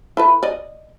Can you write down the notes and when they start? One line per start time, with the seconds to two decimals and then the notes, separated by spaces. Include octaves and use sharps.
0.17 E4 A4 B4
0.43 D5 D#5